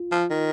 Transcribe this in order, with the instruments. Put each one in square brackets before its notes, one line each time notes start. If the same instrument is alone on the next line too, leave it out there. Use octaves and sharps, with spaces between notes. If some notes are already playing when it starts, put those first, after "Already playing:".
Already playing: [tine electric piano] F4
[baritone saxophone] F3
D#3